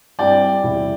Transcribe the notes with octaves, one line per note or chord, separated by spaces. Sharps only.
G2 G3 C4 E4 D5 G5
E2 C3 G3 E4